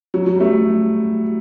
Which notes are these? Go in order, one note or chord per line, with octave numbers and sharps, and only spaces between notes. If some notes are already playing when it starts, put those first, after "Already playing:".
F#3
F#3
G3
A3